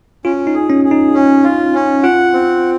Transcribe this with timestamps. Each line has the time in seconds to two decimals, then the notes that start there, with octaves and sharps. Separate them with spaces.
0.25 C#4 F4
0.47 D#4
0.54 G#4
0.70 C#4
0.85 G#4
0.91 D#4
1.14 C#4
1.44 F4
1.74 C#4
2.03 F4 F#5
2.33 C4